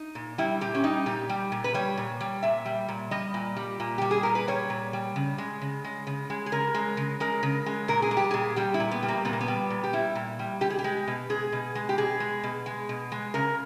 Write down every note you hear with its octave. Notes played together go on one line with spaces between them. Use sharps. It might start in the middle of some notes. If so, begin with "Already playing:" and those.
Already playing: D#4
A#2
G3 E4
A#2 G4
C#4
G3 D#4
A#2 G4
G3
A#2
B4
G3 C#5
A#2
G3
A#2 E5
G3
A#2
G3 D#5
A#2
G3
A#2
G3 G4
G#4
A#2 A#4
B4
G3 C#5
A#2
G3
C#3
G#3
C#3
G#3
C#3
G#3
G#4
C#3 A#4
G#3
C#3
G#3 A#4
C#3
G#3
A#2 A#4
G#4
G3
G4
A#2 G#4
G3 G4
E4
A#2
B3
G3
A#3
A#2 B3
A#3
B3
G3
A#2
G4
G3 E4
A#2
G3
B2 G4
G#4
G4
G#3
B2
G#3 G#4
B2
G#3
G4
B2 G#4
G#3
B2
G#3
B2
G#3
C#3 A#4